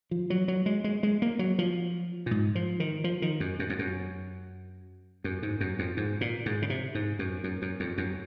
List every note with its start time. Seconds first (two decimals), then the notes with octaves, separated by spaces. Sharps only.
0.11 F3
0.30 F#3
0.48 F#3
0.66 G#3
0.84 G#3
1.03 G#3
1.22 A#3
1.39 F#3
1.59 F3
2.26 A#2
2.31 G#2
2.55 F3
2.80 D#3
3.04 F3
3.22 D#3
3.40 F#2
3.59 F#2
3.70 F2
3.79 F#2
5.24 F#2
5.43 G#2
5.61 F#2
5.79 F2
5.97 G#2
6.21 A#2
6.46 G#2
6.62 C#3
6.70 C3
6.95 G#2
7.19 F#2
7.44 F#2
7.62 F#2
7.80 F2
7.98 F#2